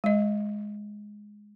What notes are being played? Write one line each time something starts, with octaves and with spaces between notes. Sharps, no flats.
G#3 D#5